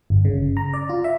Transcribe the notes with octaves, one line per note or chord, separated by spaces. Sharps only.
G1
C#3
A#5
D5
F4
E5